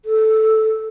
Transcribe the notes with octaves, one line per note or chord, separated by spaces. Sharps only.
A4